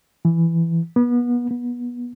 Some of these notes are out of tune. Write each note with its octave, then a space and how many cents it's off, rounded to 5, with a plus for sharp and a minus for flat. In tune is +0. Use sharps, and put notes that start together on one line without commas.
E3 +10
B3 -30
B3 -25